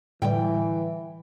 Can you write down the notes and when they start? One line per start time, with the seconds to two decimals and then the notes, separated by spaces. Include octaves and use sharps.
0.22 A2 D3 E3 G3 G5